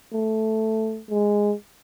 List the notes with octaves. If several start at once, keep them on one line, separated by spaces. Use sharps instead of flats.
A3
G#3